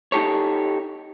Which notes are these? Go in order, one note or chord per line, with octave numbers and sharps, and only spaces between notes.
D#4 G4 A4 C#5